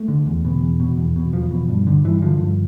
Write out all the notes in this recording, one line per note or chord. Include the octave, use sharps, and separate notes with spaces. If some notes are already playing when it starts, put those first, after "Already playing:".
Already playing: A3
D3
E2
B2
E2
B2
E2
B2
E2 F3
B2
G2
D3
G2 E3
D3 F3
G2